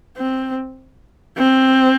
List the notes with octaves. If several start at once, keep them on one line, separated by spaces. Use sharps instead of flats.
C4
C4